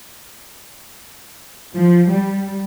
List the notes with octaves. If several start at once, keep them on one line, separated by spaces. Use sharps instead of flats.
F3
G3